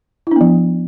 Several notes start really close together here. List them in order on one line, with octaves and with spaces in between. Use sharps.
E4 D4 B3 F3